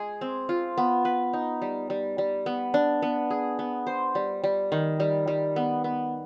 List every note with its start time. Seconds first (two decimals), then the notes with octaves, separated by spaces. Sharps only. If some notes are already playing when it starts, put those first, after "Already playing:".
Already playing: G#3 G#4
0.21 C4
0.49 F4
0.78 B3
1.05 B4
1.33 D#4
1.62 G3
1.90 G3
2.18 G3
2.46 B3
2.74 D4
3.02 B3
3.30 G#4
3.59 B3
3.87 C5
4.15 G3
4.44 G3
4.72 D#3
5.00 G3
5.28 G3
5.56 B3
5.84 B3